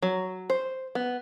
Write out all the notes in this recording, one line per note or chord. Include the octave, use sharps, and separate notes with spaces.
F#3
C5
B3